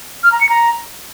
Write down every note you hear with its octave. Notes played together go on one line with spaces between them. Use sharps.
F6
A#5
C#7
A#5